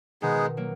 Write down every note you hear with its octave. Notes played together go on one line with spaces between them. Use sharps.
B2 D#3 G#3 B3 D#4 G#4
F#3 A#3